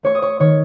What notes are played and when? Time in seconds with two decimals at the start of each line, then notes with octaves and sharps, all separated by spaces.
0.03 A3 C#5 C#6
0.15 D#6
0.22 C#5 C#6
0.40 D#3 C#5 C#6